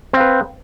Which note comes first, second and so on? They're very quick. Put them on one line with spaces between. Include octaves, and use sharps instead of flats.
C4 F5 B4